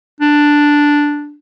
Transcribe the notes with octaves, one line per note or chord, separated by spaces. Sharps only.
D4